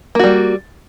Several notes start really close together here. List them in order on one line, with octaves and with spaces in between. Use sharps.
A#3 F#4 G3